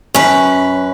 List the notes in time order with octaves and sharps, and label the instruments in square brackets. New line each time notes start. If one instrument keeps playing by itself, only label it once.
[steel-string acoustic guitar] F#2 B4 [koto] C#4